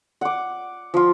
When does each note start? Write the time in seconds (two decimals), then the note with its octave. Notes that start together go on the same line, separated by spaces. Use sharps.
0.21 F#5 D6
0.94 F3 F4